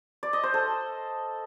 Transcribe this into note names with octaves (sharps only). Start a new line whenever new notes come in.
D5
D#5
C5
A4